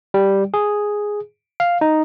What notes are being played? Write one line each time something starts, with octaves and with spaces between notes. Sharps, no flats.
G3
G#4
F5
D#4